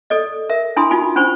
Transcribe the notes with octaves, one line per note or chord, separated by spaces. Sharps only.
A4 D5 D#5
A#4 E5
D4 E4 G#5 B5 C6 D#6
D#4 F4 F#4 G#5 B5
C#4 D4 C5 G#5 B5 C#6